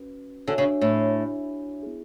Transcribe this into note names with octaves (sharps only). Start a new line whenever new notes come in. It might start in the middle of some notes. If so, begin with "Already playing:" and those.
Already playing: C#4 F#4 B4
D3 D4 F#4 C#5 E5 G#5
C#3
A2
B3 E4 G#4